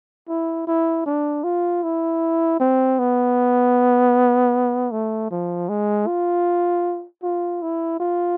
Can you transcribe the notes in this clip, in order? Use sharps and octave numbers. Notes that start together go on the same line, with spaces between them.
E4
E4
D4
F4
E4
C4
B3
A3
F3
G#3
F4
F4
E4
F4